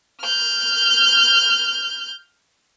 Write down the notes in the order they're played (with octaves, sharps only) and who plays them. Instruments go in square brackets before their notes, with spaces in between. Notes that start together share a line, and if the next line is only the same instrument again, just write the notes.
[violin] F6 G6